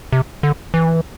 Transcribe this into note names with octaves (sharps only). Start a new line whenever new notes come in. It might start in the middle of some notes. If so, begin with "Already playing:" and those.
C3
D3
E3